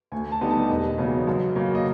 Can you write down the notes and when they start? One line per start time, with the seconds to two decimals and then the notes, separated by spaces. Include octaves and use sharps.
0.12 D2 G#5
0.32 A5
0.41 D3 G3 B3 D#4
0.50 A5
0.69 E1 D#5
0.98 E2 C#3 F#3 B3
1.27 F#2
1.56 C#3 F#3 A#3
1.75 D#5